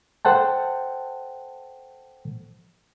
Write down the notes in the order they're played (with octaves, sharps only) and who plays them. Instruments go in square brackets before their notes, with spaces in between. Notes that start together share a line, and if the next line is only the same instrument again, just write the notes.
[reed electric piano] A4 C5 F#5 G5 A5